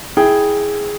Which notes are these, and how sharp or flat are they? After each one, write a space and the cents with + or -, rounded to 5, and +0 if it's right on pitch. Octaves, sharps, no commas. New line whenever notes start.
E4 -10 G#4 +0 G5 -5